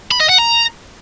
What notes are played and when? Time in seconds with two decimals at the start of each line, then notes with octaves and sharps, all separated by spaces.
0.11 B5
0.20 D#5
0.29 F#5
0.38 A#5